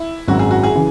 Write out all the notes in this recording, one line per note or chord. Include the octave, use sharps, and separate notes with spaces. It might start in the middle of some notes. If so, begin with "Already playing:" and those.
Already playing: E4
G#1 F#2 F#3 F#4
G#4
F#4
G#4
C#3 E3